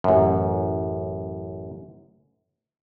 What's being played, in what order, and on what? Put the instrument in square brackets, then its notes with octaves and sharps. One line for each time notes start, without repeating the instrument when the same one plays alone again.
[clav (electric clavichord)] A1 F#2